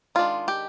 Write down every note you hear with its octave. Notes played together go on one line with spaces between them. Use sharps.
D#3 G#3 D4 F4
G4